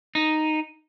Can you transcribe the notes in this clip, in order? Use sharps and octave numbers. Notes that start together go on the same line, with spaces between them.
D#4